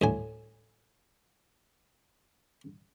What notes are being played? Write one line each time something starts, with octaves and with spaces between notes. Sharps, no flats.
D2 A2 G#5